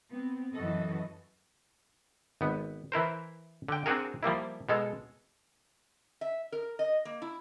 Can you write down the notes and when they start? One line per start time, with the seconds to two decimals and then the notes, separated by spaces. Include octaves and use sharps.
0.11 B3 C4
0.54 F#2 E3 F#4 A4 D#5
2.41 G#1 B3
2.92 E3 E4 A#4 C5
3.68 D3 G5
3.86 C4 D4 F#4 G#4 A#4
4.23 F3 G3 A#3 E4
4.69 B2 G#3 A4
6.21 E5
6.52 A#4
6.79 D#5
7.05 A#3
7.22 E4